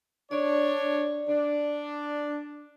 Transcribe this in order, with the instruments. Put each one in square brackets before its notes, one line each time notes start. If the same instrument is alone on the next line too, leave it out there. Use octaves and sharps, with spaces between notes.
[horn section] D4 C#5 [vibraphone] D5
[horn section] D4